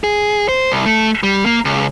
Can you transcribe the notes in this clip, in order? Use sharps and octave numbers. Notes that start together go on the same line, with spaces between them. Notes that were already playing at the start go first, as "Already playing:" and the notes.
G#4
C5
C2
A3
G3
A#3
C#2